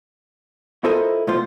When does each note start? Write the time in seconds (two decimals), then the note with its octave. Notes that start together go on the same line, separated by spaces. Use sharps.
0.84 E4 F4 A4 A#4 C5 D#5
1.27 B2 A3 F4 C5